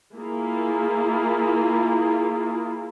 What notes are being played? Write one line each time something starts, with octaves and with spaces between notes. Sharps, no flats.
A#3 E4 F4 G#4